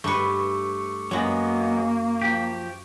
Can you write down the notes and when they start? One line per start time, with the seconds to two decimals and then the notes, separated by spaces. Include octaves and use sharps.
0.04 G2 A3 B4 C#6 D6 C#7
1.11 F#2 F#3 G#3 A#3 B3 F#4
2.22 F3 G4